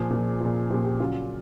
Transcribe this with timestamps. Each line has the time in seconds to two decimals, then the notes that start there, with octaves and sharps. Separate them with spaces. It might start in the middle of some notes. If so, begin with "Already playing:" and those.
Already playing: A#2 F3 G#4
0.10 A#2 F3
0.40 A#2 F3
0.70 A#2 F3 G4
0.85 G4
1.00 C#3 F#3 F4